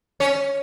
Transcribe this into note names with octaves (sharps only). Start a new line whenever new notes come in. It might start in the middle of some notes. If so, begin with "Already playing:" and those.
C#4